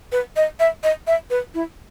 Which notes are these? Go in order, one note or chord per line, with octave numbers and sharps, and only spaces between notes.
B4
D#5
E5
D#5
E5
B4
E4